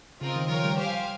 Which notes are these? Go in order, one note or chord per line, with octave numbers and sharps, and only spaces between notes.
C#3 C4 F4 A#4 D#5
D#3
F3 F4 A#4 C#5 G5
G3
G4 C5 F5 G#5